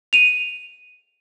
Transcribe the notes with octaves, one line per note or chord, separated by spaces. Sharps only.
D#7 F7